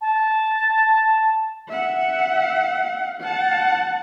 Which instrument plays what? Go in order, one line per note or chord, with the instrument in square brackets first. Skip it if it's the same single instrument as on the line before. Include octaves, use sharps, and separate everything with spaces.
[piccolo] A5
[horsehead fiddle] E5 F#5
F#5 A5